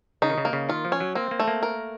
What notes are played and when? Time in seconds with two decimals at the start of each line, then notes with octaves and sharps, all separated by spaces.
0.22 C#3 D#4
0.30 D#3
0.38 C#3
0.45 A#3
0.53 C#3
0.69 D#3 F4
0.85 F3
0.92 C#4
1.00 F#3
1.15 A#3 C4
1.31 A#3
1.40 A3
1.48 A#3
1.63 A#4